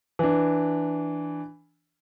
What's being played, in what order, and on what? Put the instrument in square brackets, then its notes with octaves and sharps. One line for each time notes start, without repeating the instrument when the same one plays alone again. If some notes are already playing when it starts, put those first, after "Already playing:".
[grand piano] E3 D4